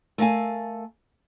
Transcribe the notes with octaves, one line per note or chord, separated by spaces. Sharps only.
A3 A#4 F5 G#5